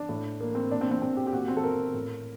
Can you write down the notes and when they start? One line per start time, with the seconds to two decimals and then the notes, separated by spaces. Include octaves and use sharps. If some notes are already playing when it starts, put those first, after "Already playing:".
Already playing: D4
0.09 A2
0.41 A#3
0.55 C4
0.71 A#2 D4
0.81 C4
0.91 C4
1.02 C4
1.17 G4
1.27 G4
1.32 A#2 F#4
1.48 C4
1.57 A4
1.64 A#4
1.94 A2